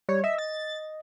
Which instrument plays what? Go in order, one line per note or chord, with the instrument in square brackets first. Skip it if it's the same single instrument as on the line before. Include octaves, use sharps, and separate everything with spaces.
[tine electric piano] G3 [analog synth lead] C#5
[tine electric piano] D#5 [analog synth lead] E5
[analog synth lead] A6